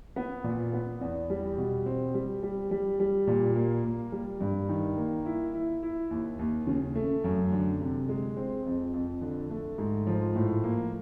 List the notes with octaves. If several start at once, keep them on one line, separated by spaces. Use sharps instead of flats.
B3
A#2
B3
E2
G3
B2
C4
G3
G3
G3
G3
A#2
A#3
A#3
G3
G2
D#3
A#3
E4
E4
E4
D#2
D#2
C#3
A3
F#2
D3
C3
G#3
C4
F2
F2
D3
A3
G#2
F3
A2
A#3